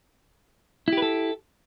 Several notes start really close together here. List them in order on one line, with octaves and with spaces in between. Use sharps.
E4 G4 B4 A4